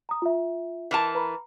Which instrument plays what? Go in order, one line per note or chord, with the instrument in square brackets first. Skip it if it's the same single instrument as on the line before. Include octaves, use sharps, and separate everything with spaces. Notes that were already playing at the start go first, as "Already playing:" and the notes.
[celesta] A#5 D#6
F4 E5
[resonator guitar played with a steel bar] E3 A#4 A5
[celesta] B4 A#5 B5